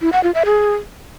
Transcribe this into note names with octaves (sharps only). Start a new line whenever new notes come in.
E4
F#5
F4
E5
G#4